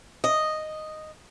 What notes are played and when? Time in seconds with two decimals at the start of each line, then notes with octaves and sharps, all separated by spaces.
0.24 D#5